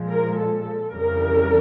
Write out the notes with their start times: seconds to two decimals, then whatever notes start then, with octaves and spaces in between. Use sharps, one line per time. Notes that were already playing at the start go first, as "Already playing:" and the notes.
Already playing: A#2 F3 G#3
0.08 A#4
0.36 A4
0.93 F2 C#3 E3 G3 A#4